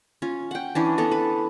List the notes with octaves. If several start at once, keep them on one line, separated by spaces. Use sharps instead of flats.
C#4 F4
F#5 G5
E3 C#4 D4
B3 A4 A#5
B4